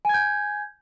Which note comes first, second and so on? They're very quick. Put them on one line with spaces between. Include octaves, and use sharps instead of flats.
G#5 G#6 G6